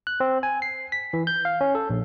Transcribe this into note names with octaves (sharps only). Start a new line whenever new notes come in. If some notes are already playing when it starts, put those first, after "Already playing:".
F#6
C4
G#5
C7
B6
E3
G6
F5
C#4
A4
A#1